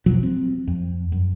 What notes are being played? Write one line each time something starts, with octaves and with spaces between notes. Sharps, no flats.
E1 B1 F3 F#3
C4
F2
F#2